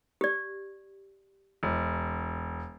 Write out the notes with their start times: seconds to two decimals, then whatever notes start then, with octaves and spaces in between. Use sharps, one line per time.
0.21 G4 D5
1.63 E1